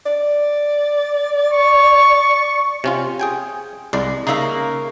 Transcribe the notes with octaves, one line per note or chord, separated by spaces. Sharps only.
D5
C#6
C3 C#4 F4
G#4 G5 G#5
C2 G#3 D5
C#3 A#3 D#4 A#4 E5